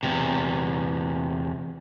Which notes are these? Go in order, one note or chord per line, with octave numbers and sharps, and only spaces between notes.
E2 C3